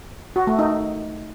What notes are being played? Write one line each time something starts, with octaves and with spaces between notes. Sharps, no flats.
F#4
A3
D#4